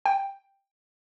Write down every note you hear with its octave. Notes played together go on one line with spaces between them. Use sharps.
G5